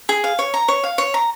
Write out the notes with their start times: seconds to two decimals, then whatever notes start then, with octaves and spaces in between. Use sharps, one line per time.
0.09 G#4
0.24 F5
0.39 C#5
0.54 A#5
0.68 C#5
0.84 F5
0.98 C#5
1.14 A#5